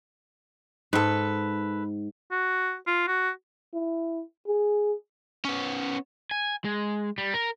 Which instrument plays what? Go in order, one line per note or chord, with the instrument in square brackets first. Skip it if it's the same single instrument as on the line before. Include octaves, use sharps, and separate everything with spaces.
[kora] G#2 [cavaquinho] A4 B4
[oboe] F#4
F4
F#4
[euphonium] E4
G#4
[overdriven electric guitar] B3 C#4
G#5
G#3
G3
A#4